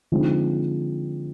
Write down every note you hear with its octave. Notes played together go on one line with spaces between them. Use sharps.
D3 F3 G#3 C4 D#4